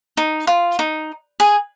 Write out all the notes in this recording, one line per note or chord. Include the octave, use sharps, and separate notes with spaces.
D#4
F4
D#4
G#4